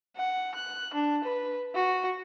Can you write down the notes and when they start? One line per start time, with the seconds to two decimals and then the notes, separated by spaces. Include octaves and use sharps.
0.17 F#5
0.55 F#6
0.94 D4
1.24 B4
1.75 F#4